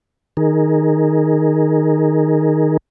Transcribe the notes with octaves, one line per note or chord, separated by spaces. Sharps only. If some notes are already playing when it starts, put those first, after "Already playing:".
D#3 D#4 G#4 A#4